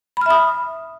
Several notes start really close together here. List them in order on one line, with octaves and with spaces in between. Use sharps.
B5 F6 E5 D#6